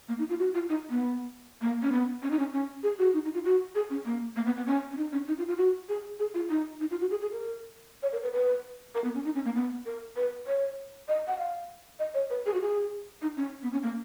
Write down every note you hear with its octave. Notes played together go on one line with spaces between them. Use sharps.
A#3
D#4
F4
F#4
F4
D#4
B3
A#3
C#4
B3
C#4
D#4
C#4
C#4
G#4
F#4
D#4
D#4
F4
F#4
G#4
C#4
A#3
A#3
B3
B3
C#4
C#4
D#4
C#4
D#4
F4
F4
F#4
G#4
G#4
F4
D#4
D#4
F4
F#4
G#4
G#4
A#4
C#5
A#4
B4
B4
A#4
B3
C#4
D#4
C#4
A#3
B3
A#4
B4
C#5
D#5
F#5
F5
D#5
C#5
B4
G#4
F#4
G#4
D#4
C#4
B3
C#4
A#3